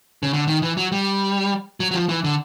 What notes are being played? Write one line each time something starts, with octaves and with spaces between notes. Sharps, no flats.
C#3
D3
D#3
E3
F#3
G3
F#3
F#3
F3
E3
D3